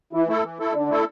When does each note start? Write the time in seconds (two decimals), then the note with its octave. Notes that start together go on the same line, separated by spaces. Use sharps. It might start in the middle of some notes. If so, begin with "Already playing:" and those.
0.13 E3 E4
0.28 A3 E4 A4
0.43 E3
0.59 A3 E4 A4
0.74 D3 D4
0.89 A3 E4 A4